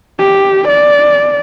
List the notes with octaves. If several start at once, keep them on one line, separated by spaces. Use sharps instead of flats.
G4
D5